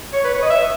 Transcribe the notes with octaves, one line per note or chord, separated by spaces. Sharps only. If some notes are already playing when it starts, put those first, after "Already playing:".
C#5
B4
C#5
D#5
E5